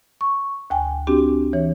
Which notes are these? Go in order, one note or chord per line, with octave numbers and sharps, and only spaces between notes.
C#6
D2 G5 G#5
C4 D4 F#4 G4
E3 C#5